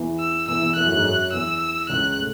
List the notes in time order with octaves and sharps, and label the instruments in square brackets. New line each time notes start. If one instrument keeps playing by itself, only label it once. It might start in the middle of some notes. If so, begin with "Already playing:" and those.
Already playing: [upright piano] E2 E3
[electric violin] E6
[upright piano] E2 E3 [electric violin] E6
[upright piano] E2 E3
[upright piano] E2 E3 [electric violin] F#6
[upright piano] F#2 F#3
G#2 G#3
F#2 F#3
[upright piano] E2 E3 [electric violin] E6
[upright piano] C#2 C#3 [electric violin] F#6
[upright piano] A2